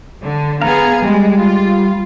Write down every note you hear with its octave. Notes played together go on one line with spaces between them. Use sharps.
D3
B3 G#4 F5 A#5
G3 G#3
F4